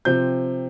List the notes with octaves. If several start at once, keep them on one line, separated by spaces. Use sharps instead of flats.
C3 F3 C4 G6